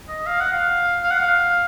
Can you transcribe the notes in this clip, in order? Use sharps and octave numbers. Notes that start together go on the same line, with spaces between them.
D#5
F5
F#5
F5
F5
F#5
F5